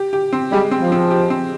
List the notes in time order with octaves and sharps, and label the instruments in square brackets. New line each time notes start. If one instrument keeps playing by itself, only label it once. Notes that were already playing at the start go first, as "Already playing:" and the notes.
Already playing: [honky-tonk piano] G4
G4
C4
[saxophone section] G3 [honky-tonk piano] G#3
[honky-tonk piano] C4
[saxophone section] F3
[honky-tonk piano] C4
G4
C4